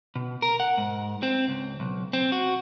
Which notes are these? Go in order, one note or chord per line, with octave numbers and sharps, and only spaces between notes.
B2
A#4
F#5
G#2
C4
C#2
B1
C4
F#4